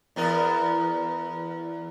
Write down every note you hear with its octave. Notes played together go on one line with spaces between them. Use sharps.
E2 B3 A#4